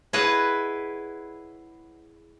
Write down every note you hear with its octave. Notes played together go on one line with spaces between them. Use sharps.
E4 G#4 B4 C#5 D#5 F#5